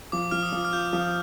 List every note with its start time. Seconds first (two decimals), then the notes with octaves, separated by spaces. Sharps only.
0.12 F3 D6
0.31 F3 F6
0.43 D#6
0.52 F3
0.65 F6
0.73 F4 G6
0.93 F3